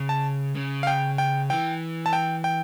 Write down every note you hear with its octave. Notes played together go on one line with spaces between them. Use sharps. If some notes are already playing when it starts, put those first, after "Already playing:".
Already playing: C#3
A5
C#3
F5
G5
G5
E3 G5
A5
G5
G5